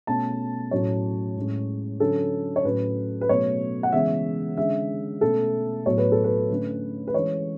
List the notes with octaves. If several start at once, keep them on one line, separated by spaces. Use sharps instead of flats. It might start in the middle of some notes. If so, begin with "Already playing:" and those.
B2 A3 C#4 A5
A2 F#3 A3 C#4 C#5
A2 G#3 C#4
D3 F#3 C#4 A4
C#5
A2 F#3 C#4 B4
B4
B2 F#3 A3 C#4 C#5
F#5
C#3 E3 G#3 B3 E5
D3 G#3 C#4 E5
B2 A3 C#4 A4
A2 F#3 B3 C#5
B4
A4
B4
D3 A3 C#4
B4
E3 G#3 C#4 C#5